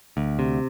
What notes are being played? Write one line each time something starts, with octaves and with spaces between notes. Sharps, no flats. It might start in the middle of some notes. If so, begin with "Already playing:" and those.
D2
C3